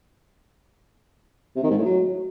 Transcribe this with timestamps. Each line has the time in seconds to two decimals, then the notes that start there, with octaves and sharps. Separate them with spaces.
1.56 C3
1.63 D#3
1.70 G#2
1.78 A2
1.85 F#3